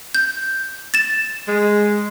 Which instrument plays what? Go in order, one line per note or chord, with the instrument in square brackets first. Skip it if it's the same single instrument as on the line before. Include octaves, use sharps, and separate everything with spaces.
[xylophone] G6
A6 E7
[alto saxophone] G#3